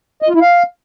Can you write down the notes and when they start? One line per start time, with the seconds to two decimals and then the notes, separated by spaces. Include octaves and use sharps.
0.22 D#5
0.29 F4
0.35 E4
0.41 F5